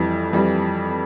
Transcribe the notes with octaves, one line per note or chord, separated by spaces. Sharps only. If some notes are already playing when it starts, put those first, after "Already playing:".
Already playing: F2 E3 G3
F2 E3 G3